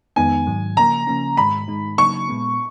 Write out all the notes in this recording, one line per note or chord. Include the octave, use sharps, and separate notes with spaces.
F2 D#3 G#3 B3 D#4 G#5
G#2 D#3 F#3
C#3 F3 A#3 A#5
C#3 F3 A#3 C#4
G#2 D#3 G#3 B5
G#2 D#3 G#3 D#4
C#3 F#3 A#3 D#4 C#6
A#2 G#3 B3